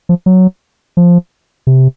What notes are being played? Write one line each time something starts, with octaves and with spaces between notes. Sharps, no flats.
F3
F#3
F3
C3